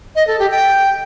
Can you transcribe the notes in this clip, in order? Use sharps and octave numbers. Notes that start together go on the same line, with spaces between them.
D#5
A4
G4
G5